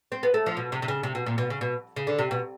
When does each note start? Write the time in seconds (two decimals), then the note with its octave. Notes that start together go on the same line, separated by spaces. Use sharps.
0.12 C4
0.23 B3
0.34 A3
0.46 F3
0.57 B2
0.72 C3
0.82 C3
0.88 C#3
1.03 C3
1.15 B2
1.26 A#2
1.38 B2
1.50 C#3
1.61 B2
1.96 C#3
2.07 D3
2.19 C3
2.31 B2